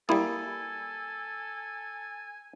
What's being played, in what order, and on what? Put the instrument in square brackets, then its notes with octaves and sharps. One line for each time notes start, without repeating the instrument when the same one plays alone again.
[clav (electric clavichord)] G3 A#3 [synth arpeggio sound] E4 D#6 [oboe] A4 [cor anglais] G#5